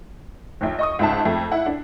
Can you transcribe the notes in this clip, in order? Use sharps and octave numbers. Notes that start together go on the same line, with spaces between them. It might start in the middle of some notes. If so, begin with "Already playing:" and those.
A#1 D#2
D#5 C#6 D#6
C#2 G#2 E5 A5
F2 A3
E4 F#5
D4